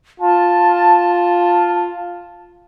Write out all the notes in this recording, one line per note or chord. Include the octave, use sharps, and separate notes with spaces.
F4 A5